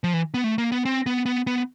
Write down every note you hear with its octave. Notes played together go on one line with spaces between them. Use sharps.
F3
E3
B3
A3
A#3
B3
C4
B3
B3
B3